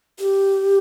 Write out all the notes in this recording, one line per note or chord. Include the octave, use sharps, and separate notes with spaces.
G4